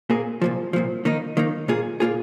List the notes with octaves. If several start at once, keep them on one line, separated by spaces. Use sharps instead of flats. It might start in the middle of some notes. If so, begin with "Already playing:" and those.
A#2 A#3 G#4
C2 A#2 F3
C2 A#2 F3
D#3 A#3 D#4
D#3 A#3 D#4
A#2 A#3 F4 G#4
A#2 A#3 F4 G#4